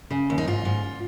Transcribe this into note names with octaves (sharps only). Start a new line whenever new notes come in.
C#3
D#2
D#4
G#2 F4
G#2